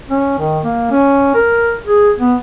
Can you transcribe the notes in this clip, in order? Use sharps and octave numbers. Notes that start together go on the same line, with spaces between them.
C#4
D#3
A#3
C#4
A#4
G#4
B3